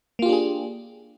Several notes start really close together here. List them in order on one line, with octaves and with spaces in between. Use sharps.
A#3 F4 G4 D4 G#4